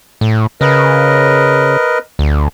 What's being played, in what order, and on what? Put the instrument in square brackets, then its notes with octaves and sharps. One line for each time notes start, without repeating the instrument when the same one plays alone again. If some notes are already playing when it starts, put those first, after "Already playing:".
[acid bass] A2
[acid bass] C#3 [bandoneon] A#4 B4 D#5
[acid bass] D2